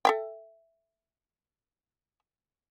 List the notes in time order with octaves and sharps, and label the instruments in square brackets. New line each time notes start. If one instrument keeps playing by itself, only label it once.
[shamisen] A4 E5 G5